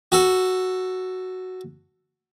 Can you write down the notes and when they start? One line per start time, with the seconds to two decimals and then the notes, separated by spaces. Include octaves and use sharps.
0.12 F#4 A4